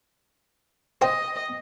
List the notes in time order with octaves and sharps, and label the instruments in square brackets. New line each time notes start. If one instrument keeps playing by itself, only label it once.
[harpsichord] C5 G5 [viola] D#5